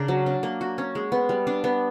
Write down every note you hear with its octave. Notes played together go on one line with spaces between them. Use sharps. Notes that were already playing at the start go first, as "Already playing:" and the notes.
Already playing: C#3 D4 A#4
F#3
D4
A#3
F#4
C#4
G#3
B3
G3
D4
B3